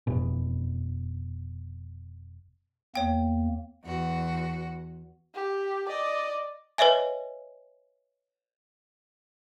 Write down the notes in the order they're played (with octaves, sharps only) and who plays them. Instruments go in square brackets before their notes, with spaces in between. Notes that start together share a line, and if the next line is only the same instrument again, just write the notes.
[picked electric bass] F1 B2
[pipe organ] E2 A#3 [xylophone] C#5 G5
[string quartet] E2 F#4
[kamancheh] G4
D5 D#5
[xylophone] B4 C#5 D#5 E5 G#5